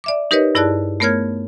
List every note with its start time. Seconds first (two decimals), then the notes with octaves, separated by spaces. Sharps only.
0.04 D5 E5 D6
0.31 D#4 G4 A#4 B4 C#5 D#5
0.55 G2 E4 G#4 D5 A5 F#6
1.00 A3 B3 A#4 C#5 F6 G#6